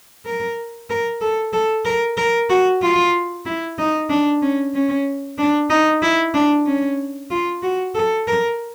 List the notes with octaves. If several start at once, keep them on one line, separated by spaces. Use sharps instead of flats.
A#4
A#4
A4
A4
A#4
A#4
F#4
F4
E4
D#4
D4
C#4
C#4
D4
D#4
E4
D4
C#4
F4
F#4
A4
A#4